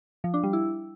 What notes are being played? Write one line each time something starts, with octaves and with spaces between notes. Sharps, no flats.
F3
D4
G3
E4